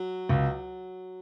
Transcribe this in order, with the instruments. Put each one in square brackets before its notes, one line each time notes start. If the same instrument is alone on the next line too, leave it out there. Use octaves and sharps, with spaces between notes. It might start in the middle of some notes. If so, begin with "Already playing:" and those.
Already playing: [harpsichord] F#3
[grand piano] C#2